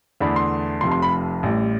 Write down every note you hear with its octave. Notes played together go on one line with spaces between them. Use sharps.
E2 D3 A3 D4 B5
C6
F1 F2 C3 F3 C6
C6
B5
A1 A2 G3